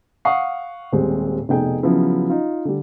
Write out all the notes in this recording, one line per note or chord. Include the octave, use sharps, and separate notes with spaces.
F5 F#5 C#6 D#6 C7
D#1 G3 G#3 C4
F1 B2 D#4 G#4 A4 G5
C#3 F3 F#3 B3 E4
D#4 F4
D3 G3